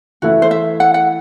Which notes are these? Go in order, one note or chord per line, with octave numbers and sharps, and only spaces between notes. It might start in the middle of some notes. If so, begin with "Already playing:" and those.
E3 A3 E4 F#4
C5
E5
F#5
F#5